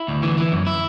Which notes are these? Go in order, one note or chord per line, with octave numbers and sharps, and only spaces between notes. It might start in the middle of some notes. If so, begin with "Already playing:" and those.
Already playing: E4
D2
E3
E3
F#2
E4